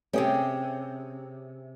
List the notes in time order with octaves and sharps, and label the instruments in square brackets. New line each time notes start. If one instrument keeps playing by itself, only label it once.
[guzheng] C3 G#4 G5 [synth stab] G3 A3 B3 [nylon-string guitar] C#4